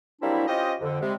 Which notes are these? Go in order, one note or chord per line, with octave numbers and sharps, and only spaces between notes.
F#3 G3 A#3 C4 D4 E4
C#4 F4 G4 C5 D#5
F2 D3
C3 G3 G#3